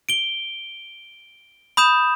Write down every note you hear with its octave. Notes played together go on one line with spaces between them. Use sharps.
D7 G7
B5 D#6 G6 E7